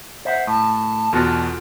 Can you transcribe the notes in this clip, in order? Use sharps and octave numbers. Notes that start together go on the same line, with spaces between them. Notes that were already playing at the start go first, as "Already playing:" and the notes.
C5 E5 F#5
A2 A5
E2 B2 F4 F#4 A4